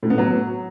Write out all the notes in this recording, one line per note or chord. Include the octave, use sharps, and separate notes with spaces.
A2
B3
F#3